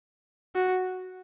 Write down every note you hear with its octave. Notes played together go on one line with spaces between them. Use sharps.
F#4